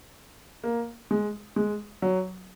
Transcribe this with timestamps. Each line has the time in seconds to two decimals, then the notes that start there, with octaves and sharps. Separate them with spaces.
0.64 A#3
1.11 G#3
1.56 G#3
2.02 F#3